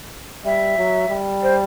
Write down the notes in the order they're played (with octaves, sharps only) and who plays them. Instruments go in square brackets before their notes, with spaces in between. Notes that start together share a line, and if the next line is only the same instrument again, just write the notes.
[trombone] G3 [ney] E5
[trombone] F#3
G3
[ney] C5